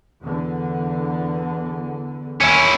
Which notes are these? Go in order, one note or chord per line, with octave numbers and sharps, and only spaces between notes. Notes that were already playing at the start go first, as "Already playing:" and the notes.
E2 D3
D#2 C#4 E4